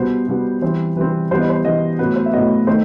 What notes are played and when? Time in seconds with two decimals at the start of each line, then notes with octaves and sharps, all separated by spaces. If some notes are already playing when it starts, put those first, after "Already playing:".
Already playing: B2 G3 B3 C5
0.28 B2 G3 B3
0.62 E3 G3 C4 C5
0.96 E3 G3 C4 B4
1.31 E3 G3 B3 C5
1.40 D#5
1.49 C5
1.65 E3 G3 B3 D#5
1.99 A2 F#3 B3 B4
2.16 C5
2.26 E5
2.33 A2 F#3 B3 D#5
2.67 D#3 A3 C4 C5